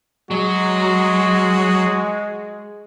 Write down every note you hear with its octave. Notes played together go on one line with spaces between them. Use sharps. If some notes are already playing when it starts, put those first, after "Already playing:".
F#3 G#3 F#4 G#4